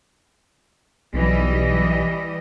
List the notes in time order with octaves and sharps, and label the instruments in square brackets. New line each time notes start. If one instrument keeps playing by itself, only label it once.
[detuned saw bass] B1 [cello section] E3 G3 D#5